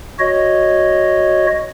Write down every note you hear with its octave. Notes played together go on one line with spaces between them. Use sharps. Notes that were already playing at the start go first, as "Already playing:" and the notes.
F#4 C#5 D#5